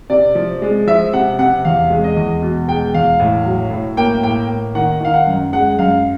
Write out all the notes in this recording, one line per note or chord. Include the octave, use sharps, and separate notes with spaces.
C3 D5
F3
G#3
F3 E5
C3 F#5
C3 F#5
E2 F5
G#3
D#5
E2
B2
G#3 G5
E2 F5
A2
F#3
A2
A#3 G5
A2 G5
A#3
D#3 F#5
D#3 F5
F#5
F#2
G#3 F#5
F#2 F5